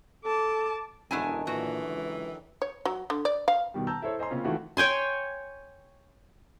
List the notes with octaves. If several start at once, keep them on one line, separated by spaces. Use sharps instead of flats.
A4 A5 D6
E1 F#2 D3 D#3 D4 E4 G#5
A#2 E3 F#4
C#2
C#5
F#3
D3
D5
F5
B2 D#3 G3
A5 A#5 E6 G6
E4 A4 C5 C#5
C5 D#5 G#5 A#5 C6
C#3 A#3 C4 C#4 F4
D#3 E3 A3 D#4 F4 F#4
C#5 G5 G#5 C6